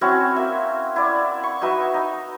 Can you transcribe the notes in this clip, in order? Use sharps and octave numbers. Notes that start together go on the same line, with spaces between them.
C4 C#4 E4 F#4
A#3 E5
E4 D5
C#6
D#4 F#4 B4 E5
D#4